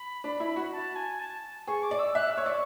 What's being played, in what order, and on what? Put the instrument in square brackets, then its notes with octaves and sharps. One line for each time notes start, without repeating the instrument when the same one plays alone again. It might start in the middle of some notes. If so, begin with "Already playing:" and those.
Already playing: [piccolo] B5
[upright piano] D4
E4
F#4
[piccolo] A5
G#5
A5
[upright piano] G#4 [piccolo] C#6
[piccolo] D6
[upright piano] D5
[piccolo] E6
[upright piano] E5 [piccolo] F#6
[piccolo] E6
[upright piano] C#5
[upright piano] D5 [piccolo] C#6